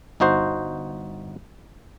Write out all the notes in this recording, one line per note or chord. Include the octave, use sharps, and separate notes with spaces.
G1 D#4 F#4 C5